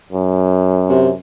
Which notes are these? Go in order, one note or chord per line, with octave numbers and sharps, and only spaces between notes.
F#2
C3